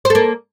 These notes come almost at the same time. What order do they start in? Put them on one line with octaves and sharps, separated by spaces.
C5 A4 A#3